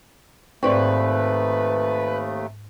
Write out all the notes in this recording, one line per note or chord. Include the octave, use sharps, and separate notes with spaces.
D#2 G#2 A3 C4 B4 D5 C#6